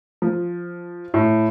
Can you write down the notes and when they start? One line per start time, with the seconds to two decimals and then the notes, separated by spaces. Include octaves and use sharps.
0.22 F3
1.14 A2